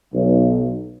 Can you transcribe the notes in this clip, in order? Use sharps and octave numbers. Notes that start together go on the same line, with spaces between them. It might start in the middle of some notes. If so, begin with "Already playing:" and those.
B1